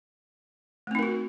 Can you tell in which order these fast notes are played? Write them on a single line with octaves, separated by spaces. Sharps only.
A3 C4 D#4 A#4 F#4